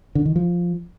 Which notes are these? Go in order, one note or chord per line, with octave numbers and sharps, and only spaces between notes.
D3
D#3
F3